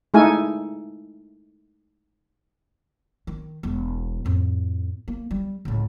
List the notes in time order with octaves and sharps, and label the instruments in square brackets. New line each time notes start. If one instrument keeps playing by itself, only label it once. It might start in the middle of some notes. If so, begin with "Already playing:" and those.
[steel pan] G#3 A3 D#4 E4 A4 G#5
[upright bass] D#3
E1 G#3
F2 A2
A#3
G3
C#2 A2